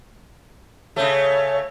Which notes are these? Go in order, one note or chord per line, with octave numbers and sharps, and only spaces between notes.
C#3 A3 C#5